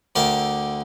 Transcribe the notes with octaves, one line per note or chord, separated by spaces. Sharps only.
D2 D3 A#4 E5 G5 A5